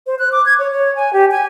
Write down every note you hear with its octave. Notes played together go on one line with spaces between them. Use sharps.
C5
F#6
D6
G#6
C#5
C#5
G#5
G4
G#5